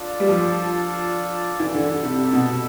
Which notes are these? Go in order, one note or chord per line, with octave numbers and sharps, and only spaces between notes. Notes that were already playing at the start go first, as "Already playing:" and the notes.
Already playing: D4 F4 A4 D5
G3
F3
E3 G3 D4 A4
D3
D3
C3
C3
B2